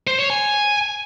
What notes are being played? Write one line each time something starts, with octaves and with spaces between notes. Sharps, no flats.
C5
C#5
G#5